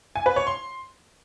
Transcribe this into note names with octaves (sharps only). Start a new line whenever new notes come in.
G#5
B4
C#5
C6